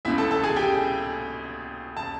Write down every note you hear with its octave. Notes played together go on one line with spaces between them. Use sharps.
C#2 B2 E4 E5
A4 A5
A4 A5
G#4 G#5
G4 G5
A5